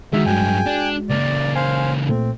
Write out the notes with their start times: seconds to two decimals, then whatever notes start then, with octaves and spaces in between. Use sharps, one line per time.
0.13 D3 D#3 G#3 F#4 E5
0.26 G2 F#3 G5 G#5
0.66 D4
1.09 C#2 A#3 D5
1.55 C5 F5 G#5
2.09 A#2 A3 C4